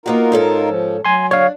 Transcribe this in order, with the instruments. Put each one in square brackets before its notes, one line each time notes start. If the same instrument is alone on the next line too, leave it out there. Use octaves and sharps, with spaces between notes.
[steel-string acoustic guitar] A#3 B3 F#4 [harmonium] D#4 F4 A#4
[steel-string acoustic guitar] G#2 C#4 A4
[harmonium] F3
[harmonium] F#3 [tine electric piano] G#5 C6
[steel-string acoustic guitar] D4 [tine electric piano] C#5 F5